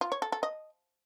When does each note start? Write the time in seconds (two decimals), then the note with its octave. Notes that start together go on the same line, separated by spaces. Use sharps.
0.01 F4
0.12 C#5
0.22 A4
0.32 A4
0.43 D#5